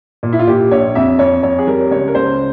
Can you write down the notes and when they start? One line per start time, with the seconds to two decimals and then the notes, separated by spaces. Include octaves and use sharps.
0.23 A#2
0.33 E4
0.39 F4
0.47 A#2 G4
0.71 A#1 C#5
0.95 F2 E5
1.19 F2 C#5
1.43 F2 C#5
1.59 G#4
1.67 G3 A#4
1.91 C#2 C#5
2.08 A#4
2.15 C#2 C5